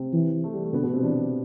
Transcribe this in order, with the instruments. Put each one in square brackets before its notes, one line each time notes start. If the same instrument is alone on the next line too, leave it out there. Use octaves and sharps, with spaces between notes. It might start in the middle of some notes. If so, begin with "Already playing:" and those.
Already playing: [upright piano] C3 C4
[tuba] E3
[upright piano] A3
G3
A3
[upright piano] B2 B3 [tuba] D3
[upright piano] B2 B3
C3 C4
[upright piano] D3 D4 [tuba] E3